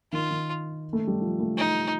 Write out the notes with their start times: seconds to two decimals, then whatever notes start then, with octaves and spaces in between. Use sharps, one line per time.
0.12 D#3 F4
0.31 D#3
0.93 A3
1.07 G3
1.21 F3
1.40 A3
1.57 D#4